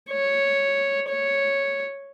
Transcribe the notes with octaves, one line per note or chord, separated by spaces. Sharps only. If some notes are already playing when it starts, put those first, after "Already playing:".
C#5
C#5